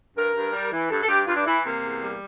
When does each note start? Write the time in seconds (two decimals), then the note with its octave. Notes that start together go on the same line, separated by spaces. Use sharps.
0.16 G2 A#4
0.35 G2
0.53 G3
0.72 E3
0.90 G2 A4
1.02 A4
1.08 G2 G4
1.26 G2 F4
1.36 D4
1.45 E3 E4
1.64 C3 A#3
1.82 E2
2.01 G3